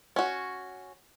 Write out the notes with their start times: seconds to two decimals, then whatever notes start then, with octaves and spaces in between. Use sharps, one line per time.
0.16 C#4 F#4